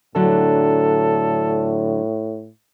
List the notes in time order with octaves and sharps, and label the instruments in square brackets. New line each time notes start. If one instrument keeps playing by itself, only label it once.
[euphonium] A2 [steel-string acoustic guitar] D3 F#3 D4 [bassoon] A4